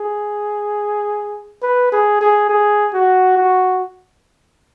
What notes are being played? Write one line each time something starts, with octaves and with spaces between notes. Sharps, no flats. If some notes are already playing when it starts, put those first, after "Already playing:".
Already playing: G#4
B4
G#4
G#4
G#4
F#4
F#4